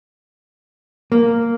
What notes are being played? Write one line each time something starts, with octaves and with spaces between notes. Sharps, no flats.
A#3